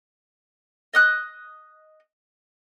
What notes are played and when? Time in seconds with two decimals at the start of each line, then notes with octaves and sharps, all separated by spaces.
0.94 D#5 D#6 F#6